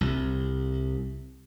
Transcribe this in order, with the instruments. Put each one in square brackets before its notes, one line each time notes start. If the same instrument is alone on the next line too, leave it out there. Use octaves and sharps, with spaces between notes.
[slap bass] C2